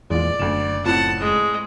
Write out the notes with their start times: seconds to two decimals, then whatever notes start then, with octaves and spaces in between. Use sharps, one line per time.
0.10 E2 A#2 G#3 D5
0.40 F#1 D2 E7
0.85 F2 A2 F3 F#5 A5
1.20 G#3